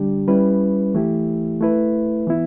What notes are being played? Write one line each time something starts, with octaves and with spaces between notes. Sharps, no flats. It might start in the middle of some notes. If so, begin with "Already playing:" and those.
Already playing: D3 G3 D4 G4
G3 C#4 E4 B4
E3 A3 E4 G4
A3 E4 B4
E3 B3 E4